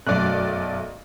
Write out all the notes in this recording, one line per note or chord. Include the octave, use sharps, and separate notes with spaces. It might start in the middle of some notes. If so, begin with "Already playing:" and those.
B1 F#2 A3 D5 F#6